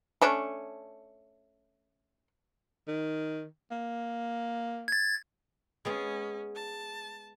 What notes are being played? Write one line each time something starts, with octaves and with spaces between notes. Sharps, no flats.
A3 C#4 D4
D#3
A#3
G#6 A6
G#3 B3 C#4 G#4
A5